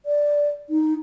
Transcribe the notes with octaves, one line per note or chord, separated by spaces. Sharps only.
D5
D#4